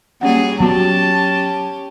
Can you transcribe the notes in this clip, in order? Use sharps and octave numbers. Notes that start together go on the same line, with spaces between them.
F#3 G3 A#3 C#4 G#4 F#5
F#3 B3 C#4 F#4 G4 A5